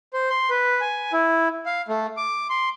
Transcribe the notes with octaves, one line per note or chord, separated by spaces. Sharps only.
C5
C6
B4
G#5
E4
F5
A3
D6
C6